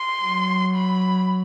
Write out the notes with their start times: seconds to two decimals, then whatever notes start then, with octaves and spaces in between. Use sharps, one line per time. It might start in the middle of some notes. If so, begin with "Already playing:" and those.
Already playing: C6
0.23 F#3
0.76 B5